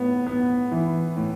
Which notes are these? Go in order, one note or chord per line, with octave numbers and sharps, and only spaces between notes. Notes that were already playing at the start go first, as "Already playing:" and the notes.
Already playing: A2 B3
B3
E3
A2